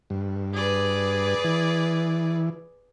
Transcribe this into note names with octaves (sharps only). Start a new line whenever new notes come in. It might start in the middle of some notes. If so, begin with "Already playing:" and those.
G2
G#4 B4 D5
E3